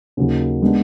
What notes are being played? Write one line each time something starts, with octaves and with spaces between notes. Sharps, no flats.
D#2 C#3 F#3 A#3 D#4
D#3 G#3 B3 D4